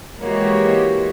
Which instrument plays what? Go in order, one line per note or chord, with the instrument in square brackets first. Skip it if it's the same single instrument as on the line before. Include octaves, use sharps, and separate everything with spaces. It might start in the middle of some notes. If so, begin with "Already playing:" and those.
[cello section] E3 G#3 A#3 F#4 G4 C#5